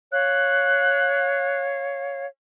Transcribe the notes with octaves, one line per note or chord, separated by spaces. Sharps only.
C#5 F5 F#6